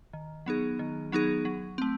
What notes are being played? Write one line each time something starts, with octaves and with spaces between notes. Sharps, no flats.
D#3
F#3 B3 D#4 G#4
D#3
F#3 B3 D#4 G#4
F#3
A3 C4